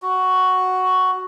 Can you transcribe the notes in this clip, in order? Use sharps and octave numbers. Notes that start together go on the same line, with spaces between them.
F#4